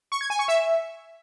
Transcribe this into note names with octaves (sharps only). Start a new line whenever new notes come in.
C#6
G#6
G#5
C#6
E5